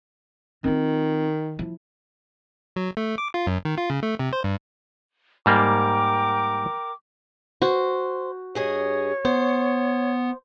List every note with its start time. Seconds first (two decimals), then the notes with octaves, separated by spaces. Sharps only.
0.64 D#3 C4 F4
1.59 F3 E4
2.76 F#3
2.97 A3
3.18 D6
3.34 F4
3.47 F#2
3.65 D#3
3.78 F4
3.90 C#3
4.03 A3
4.19 C3
4.33 C5
4.44 G2
5.46 G#2 G3 A#3 A#4 G5 D6
7.62 F#4 C5
8.55 G2 G#4 C#5 D#5
9.25 B3 C5